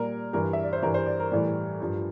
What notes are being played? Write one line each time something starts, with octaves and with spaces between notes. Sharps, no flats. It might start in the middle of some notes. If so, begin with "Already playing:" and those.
Already playing: A#2 G3 A#4
G2 E3 G3 A#4
E5
D5
C5
G2 E3 G3 A#4
C5
D5
A#4
A2 E3 G3
G2 F3